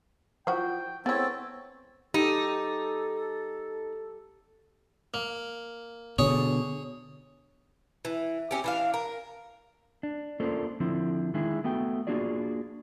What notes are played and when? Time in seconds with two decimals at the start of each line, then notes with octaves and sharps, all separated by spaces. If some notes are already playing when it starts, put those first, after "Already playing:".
0.47 F3 E4 F#4 G5
1.06 G#3 B3 C4 E4 A4 C#5
2.14 D#4 G4 A4
5.14 A#3
6.19 B2 D3 G#4 C#5
8.05 E3
8.51 C4 C#4 G4
8.64 E3 D4 F5
8.94 A#4
10.03 D4
10.40 A#3 C#4 D4 F4 A4 C5
10.80 D3 F3 C4 E4
11.34 D#3 G#3 D4 E4 G#4
11.64 A3 B3 F#4 G5
12.07 A#3 D4 F4 F#4 G#4 D5